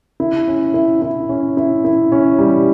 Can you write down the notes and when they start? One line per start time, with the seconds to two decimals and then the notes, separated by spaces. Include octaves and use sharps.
0.20 E4
0.48 C#4
0.74 E4
1.02 E4
1.29 C#4
1.57 E4
1.85 E4
2.12 C#4
2.39 G3